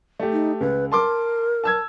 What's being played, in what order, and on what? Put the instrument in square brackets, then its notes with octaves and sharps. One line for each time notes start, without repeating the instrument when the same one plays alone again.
[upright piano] A3 G4
[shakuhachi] D#4
[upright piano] C#2 [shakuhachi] B4
[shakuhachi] A#4 [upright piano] A5 C6 D6
[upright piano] A5 E6 G#6